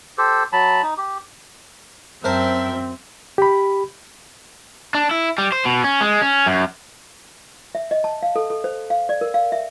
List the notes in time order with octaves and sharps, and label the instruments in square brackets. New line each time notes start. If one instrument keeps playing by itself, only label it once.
[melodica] G4 A4 C5
F#3 A5 B5
D#4
G4
[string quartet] F#2 E5 G5 [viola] C4 [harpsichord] A#4 C5 A5
[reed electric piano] G4 B5
[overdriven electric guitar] D4
E4
G3
C5
B2
C#4
G#3
C#4
F#2
[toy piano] E5
D#5
A5
F5
A4
A4
C5
F5
D5
A#4
F5
E5